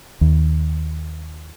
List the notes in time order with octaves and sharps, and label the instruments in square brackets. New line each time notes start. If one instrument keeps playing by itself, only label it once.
[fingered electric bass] D#2